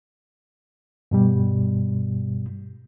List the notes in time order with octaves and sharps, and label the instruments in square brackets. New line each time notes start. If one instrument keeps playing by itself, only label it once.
[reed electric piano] G2 B2 G3